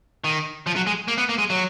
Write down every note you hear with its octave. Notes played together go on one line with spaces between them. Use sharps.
D#3
F3
F#3
G#3
A#3
B3
A#3
G#3
F#3